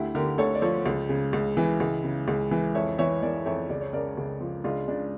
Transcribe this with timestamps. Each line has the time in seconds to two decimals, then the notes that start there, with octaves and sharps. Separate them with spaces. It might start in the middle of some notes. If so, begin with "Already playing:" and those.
Already playing: D2 E4 G4
0.15 D3 G4 A#4
0.38 D2 A4 C#5
0.55 D5
0.62 F3 A4 C#5
0.86 C#2
1.09 C#3
1.33 C#2
1.57 E3
1.80 C#2
2.04 C#3
2.28 C#2
2.51 E3
2.75 F2 C#5 E5
2.98 E3 C#5 E5
3.22 E3 A#4 D5
3.46 F2 C#5 E5
3.70 C#2 D5
3.81 C#5
3.93 C#3 A#4 D5
4.17 C#2
4.41 F3
4.64 C#2 D4 F4
4.88 C#3 D4